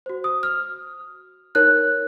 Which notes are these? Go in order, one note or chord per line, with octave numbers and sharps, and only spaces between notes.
F#4 C5
D#6
F6
D#4 A#4 C#5 F#6